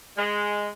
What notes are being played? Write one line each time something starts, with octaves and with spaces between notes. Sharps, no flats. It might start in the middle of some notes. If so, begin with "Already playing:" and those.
G#3